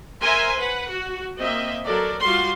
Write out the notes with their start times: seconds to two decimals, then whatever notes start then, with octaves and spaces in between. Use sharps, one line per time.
0.23 A#4 C5 E5 G#5 C6
0.58 B4 F#5
0.89 F#4
1.38 A#3 C4 D#5 E5
1.84 F#3 A4 A#4 D5
2.22 G3 F4 F#4 F5 C6